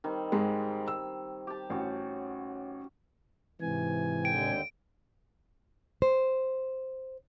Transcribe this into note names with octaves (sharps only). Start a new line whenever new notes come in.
D#3 G3 C4
G#2 G#3
E6
G4 A5
A1 C#4 F#4
G#2 C3 E3 G#5
D#2 D3 G5 D7
C5